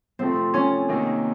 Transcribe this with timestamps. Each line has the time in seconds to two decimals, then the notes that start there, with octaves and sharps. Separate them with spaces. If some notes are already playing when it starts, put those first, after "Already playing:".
0.19 C3 F3 A3 C4
0.54 C#4
0.88 C3 D#3 A#3 D#4